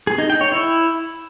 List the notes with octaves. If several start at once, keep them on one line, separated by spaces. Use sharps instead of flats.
G#4
D#4
G5
C#5
E4